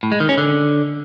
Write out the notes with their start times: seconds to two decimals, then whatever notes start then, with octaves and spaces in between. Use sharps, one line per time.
0.03 A2
0.12 G#3
0.20 D#3
0.29 C#4
0.38 D3